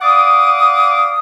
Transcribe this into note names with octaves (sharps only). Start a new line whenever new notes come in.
D5 F5 F#5 D6 D#6